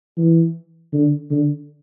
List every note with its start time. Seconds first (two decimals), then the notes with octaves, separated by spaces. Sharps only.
0.17 E3
0.93 D3
1.31 D3